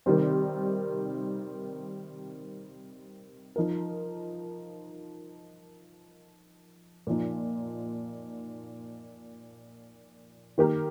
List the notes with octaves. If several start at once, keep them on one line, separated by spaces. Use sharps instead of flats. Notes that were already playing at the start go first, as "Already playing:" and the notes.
C3 D#3 G3 C4
F3 D#4 A#4
A#2 F3 D#4
D#3 A#3 G4 A#4